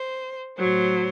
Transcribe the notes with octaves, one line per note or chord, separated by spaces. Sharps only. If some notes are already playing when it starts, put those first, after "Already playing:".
Already playing: C5
A2 F#3 C5